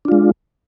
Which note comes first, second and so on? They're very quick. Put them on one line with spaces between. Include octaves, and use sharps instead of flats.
D4 F4 G#3